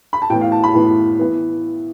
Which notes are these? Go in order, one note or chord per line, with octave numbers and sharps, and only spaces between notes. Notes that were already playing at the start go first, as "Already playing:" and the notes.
B5
A5
A2 E3 B3 G5
F5
A5
B5
A2 E3 B3
E3 B3